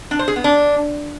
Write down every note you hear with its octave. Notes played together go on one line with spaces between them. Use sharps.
D4
C5
G#4
B3
D4